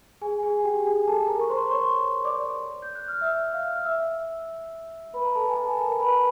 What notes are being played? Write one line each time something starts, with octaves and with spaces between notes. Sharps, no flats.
G#4 G#5
G#4 G#5
G4 G5
G#4 G#5
A4 A5
A#4 A#5
C#6
C5 C6
C6
C#5 C#6
D5 D6
G6
F#6
F6
E5 E6
F5 F6
F6
E5 E6
B4 B5
A#5
A4 A5
G#5
A4 A5
G#5
A5
A#4 A#5
B4 B5